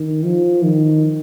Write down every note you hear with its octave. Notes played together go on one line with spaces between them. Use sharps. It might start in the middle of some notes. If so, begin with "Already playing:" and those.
Already playing: D#3
F3
D#3